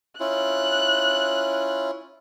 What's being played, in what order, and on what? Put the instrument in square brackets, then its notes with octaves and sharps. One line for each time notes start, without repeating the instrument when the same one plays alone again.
[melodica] C#4 E4 F4 [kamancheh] F#6